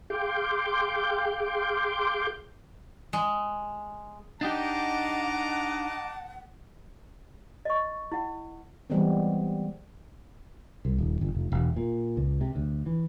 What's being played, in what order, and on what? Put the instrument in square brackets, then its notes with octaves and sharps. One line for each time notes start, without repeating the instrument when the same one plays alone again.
[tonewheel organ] G#4 F5 G5 C6 D6 G6
[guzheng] G#3
[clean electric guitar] D4 D#4 G4 [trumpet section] D#5 A#5 D6 [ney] F#5 [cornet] A5
[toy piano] D#5 C#6
E4 F#5
[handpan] E3 G3 G#3 B3 C4
[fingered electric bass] C2
D#1
G1
F1
E1
A#2
C#2
C3
D2
E3